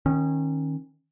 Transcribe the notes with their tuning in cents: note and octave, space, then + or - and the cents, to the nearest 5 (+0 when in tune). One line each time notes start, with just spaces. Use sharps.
D#3 +0 C#4 -25